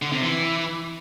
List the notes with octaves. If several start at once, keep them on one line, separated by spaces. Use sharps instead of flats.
D3
C3
E3